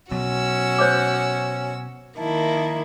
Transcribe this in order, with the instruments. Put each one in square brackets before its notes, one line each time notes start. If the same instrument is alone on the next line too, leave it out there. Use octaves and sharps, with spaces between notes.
[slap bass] B2 F#3 [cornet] C#4 [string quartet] F#4 E6
[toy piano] C5 C#5 D6
[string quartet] D#3 A#3 E4 [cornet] A5